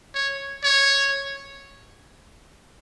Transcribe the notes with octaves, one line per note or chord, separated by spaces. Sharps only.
C#5
C#5